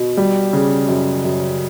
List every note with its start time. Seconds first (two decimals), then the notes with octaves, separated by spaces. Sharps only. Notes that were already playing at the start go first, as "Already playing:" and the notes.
Already playing: B2
0.17 G3
0.53 C#3
0.89 F#2
1.24 F#2